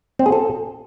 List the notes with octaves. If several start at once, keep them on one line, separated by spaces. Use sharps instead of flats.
C4
G#4
A4